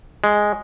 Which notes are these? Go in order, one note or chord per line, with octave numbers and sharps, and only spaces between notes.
G#3